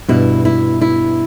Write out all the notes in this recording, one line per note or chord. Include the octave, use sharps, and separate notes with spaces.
G2 B2 E4
E4
E4